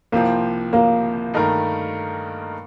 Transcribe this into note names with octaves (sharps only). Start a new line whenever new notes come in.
C2 C3 F3 A#3 C4
A#3
G2 D#3 A3 D#4 A#4